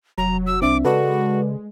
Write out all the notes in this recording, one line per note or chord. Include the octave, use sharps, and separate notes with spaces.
F1 F#3 A#5
E6
C2 C4 D4 E5 D6
C#3 G#3 F#4 A4 B4 D5